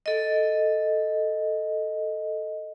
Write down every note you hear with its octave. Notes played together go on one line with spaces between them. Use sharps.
A4 D#5